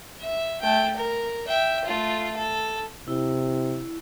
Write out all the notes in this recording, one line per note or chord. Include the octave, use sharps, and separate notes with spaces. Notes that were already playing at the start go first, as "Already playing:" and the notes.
E5
A3 G5
A#4
E5 G5
A3 F4
A4
C3 E4